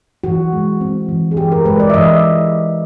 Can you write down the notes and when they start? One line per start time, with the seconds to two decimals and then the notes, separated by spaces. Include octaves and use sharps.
0.24 E3 F#4
0.53 G#3
0.81 C4
1.09 E3
1.31 G#4
1.37 E3 G4
1.52 A#4
1.65 G#3 B4
1.80 D5
1.90 E5
1.94 E3 D#5